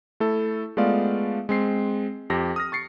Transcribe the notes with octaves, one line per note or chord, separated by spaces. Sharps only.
A3 E4 A4
G#3 A3 B3 F4 D5 F5
G#3 C4 C7
F2 G4 A#6
D#6 F6 A#6
C#6 A6 C7 C#7